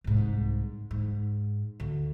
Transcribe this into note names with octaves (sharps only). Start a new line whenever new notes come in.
C2 G#2
G#2
D2